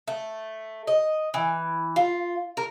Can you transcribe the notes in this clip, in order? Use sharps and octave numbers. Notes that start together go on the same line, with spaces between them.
A3
D#5
E3
F4
A#4